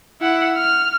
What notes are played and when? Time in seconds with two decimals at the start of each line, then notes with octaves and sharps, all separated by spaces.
0.21 E4 F#5
0.57 F6